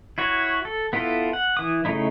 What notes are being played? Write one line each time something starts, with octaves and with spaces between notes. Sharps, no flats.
E4 F#4 C#5
A4
B3 E4 F4 A4
F#5
E3 D#6
C#3 F3 A3 D#4 E4